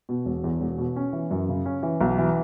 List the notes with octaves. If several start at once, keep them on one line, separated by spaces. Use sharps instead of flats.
B2
E1
E2
E1
B2
C#4
E3
F#2
C#3
C#4
E3
B1
E3